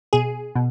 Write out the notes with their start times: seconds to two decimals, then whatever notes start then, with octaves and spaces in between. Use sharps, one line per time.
0.13 B2 G#4
0.55 B2